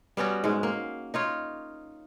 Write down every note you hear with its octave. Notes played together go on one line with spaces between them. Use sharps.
G3 B3 C#4 F#4
G#2 G#3
A#3
D#4 F4 C#5